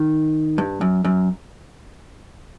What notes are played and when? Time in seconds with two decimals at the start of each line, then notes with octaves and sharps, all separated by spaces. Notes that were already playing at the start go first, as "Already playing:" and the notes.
Already playing: D#3
0.58 G2
0.81 F#2
1.05 F#2